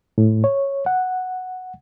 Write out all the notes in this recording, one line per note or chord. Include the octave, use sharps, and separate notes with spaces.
A2
C#5
F#5